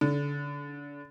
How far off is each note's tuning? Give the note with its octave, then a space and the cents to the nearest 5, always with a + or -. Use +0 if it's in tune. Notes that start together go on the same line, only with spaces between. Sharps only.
D3 -30